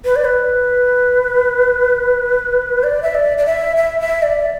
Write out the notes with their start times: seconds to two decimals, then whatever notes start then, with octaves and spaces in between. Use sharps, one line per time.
0.05 B4
0.16 D5
0.26 B4
2.84 D5
3.03 E5
3.15 D5
3.38 D5
3.46 E5
3.76 E5
4.00 E5
4.23 D5